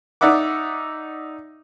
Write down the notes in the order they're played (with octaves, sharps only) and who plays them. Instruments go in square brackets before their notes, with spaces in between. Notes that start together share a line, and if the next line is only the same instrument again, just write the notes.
[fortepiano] D#4 D5 E5 F#5 D6